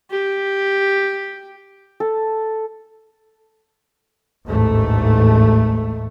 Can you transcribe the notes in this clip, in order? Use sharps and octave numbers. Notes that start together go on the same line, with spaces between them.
G4
A4
A1 D#2 G#2 A3